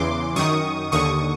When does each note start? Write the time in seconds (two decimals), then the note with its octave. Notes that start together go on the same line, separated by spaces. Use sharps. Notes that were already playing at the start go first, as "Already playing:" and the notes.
Already playing: E2 C#3 E3 C6 D6
0.36 F#2 D#3 C#6 D#6
0.92 D#2 D3 C#6 D#6